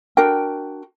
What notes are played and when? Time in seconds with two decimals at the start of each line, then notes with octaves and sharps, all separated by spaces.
0.17 D4 F#4 A#4 G5